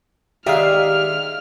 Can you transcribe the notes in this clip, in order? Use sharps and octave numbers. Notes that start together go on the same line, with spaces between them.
D#3 G#3 G4 D5 E5 F5 F6